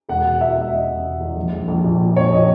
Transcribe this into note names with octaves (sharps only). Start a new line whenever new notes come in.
E1 F#5
B2
E2 E5
E1 E5
E1 D#5
E1
B2
E2
A#1
A#1
A#1
A#2
A#2
A#1 C#5
A#2 D#5